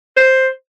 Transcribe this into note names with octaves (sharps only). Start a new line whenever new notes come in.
C5